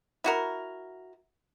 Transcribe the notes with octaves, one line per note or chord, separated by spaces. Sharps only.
E4 F#4 A#4